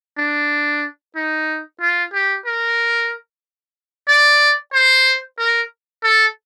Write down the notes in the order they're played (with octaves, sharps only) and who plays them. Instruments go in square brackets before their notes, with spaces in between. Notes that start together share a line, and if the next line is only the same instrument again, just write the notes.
[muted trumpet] D4
D#4
F4
G4
A#4
D5
C5
A#4
A4